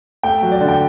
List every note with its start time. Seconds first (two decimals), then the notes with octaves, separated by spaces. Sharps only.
0.23 A3 G5
0.43 F#3
0.52 D5
0.61 D3
0.68 G5